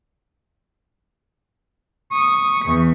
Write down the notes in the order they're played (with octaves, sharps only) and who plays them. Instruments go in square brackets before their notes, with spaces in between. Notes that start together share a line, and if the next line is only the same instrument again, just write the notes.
[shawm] C#6 [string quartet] D#6
[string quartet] E2